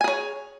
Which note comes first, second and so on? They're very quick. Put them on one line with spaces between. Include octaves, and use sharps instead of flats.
G#5 G#4 C#5